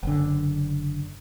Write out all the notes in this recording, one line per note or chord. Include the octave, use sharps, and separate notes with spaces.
F#1 D3